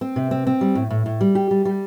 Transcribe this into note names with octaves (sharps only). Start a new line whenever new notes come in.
C4
C3
C4
C4
G3
A2
A2
A2
G3
G4
G3
G3